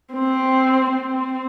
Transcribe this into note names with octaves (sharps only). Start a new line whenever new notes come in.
C4
C4